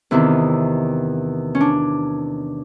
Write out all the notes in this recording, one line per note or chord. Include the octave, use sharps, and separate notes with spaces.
E2 C3 D#3 E4
C#4
D4